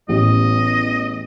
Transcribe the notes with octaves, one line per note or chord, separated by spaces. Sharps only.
A1 E2 D#5